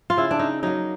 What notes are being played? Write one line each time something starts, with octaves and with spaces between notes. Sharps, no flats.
F4
C#3 E4
D4
D#4
F#3 A#3 D#4